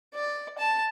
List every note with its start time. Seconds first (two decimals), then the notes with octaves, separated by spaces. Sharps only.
0.14 D5
0.58 A5